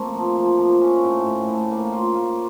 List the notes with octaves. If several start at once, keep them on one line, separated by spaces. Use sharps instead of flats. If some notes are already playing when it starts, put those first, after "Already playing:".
Already playing: A3 A#3 C4
F3
F3
F3
C#4
A2
A2
A2
A#3
F4
F4